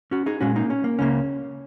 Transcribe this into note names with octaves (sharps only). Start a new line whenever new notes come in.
C#4 F#4
D#4 G#4
A#2 G#3 C#4 F#4
A#3 D#4
C#4
A#3
C#2 C#3 A#3 C#4